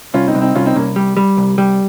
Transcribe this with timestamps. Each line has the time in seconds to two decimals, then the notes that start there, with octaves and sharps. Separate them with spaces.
0.14 C2 C#4 F4
0.27 C4 D#4
0.35 C2
0.41 C4 D#4
0.55 C2 C#4 F4
0.66 C4 D#4
0.76 C2 A#3 C#4
0.96 G3
1.17 G3
1.37 C2
1.58 G3